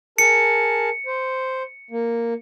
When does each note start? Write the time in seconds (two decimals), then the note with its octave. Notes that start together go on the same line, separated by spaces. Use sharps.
0.18 G#4 A#4 A5 C#7
1.06 C5
1.91 A#3